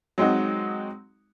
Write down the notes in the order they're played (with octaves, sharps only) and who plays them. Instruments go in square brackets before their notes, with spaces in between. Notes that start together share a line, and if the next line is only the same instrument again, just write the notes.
[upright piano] F#3 G#3 C4 D#4 F#4